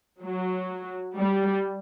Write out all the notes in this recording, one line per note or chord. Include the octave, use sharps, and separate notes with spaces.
F#3
G3